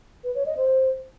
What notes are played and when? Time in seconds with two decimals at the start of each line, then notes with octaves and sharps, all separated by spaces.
0.24 B4
0.35 C#5
0.46 D#5
0.57 C5